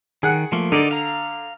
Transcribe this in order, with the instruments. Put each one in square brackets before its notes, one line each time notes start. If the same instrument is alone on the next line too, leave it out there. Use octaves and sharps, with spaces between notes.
[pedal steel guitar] D#3 [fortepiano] G#4 F#5
[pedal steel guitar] F3 A3 A#3
[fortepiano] D3 [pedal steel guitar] D#4 A#4 D5
[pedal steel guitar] F5 A#5